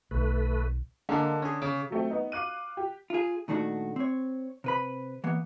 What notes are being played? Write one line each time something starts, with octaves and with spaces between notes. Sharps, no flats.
B1 D#3 A3 B4
D3 G#3 A#3 D4
C#4 G#4
C#3 D6
F#3 A3 C4
B3 D#4
F5 D6 F#6 D#7
G4
F4 G#4
A#2 D#3 A3 D4 F#4
C4 C#5
C3 B4 B5
E3 A#3 B3